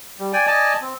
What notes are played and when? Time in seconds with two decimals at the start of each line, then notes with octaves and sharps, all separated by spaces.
0.19 G3
0.33 D5 G5 G#5
0.47 D5 D#5 G#5 A5
0.81 C4